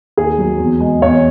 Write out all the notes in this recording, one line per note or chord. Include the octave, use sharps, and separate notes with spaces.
D#2 G#4
F#3
E2
G#3
E2 C#5